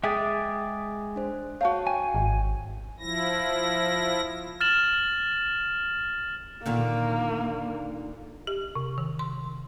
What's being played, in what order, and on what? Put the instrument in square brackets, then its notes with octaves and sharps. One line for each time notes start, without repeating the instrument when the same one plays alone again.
[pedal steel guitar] G#3 E5 G5 [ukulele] G#4 [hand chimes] D6 D#6 A6
[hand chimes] D4 C5
[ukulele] F#4 F5 [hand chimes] C#5 A5
[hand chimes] G5 [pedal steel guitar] G#5
[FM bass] G#1
[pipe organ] F3 E4 A#6
[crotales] F6 A6 E7 F#7
[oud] A#2 D3 D#3 [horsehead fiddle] A#3
[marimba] G4
C3
D#3
C6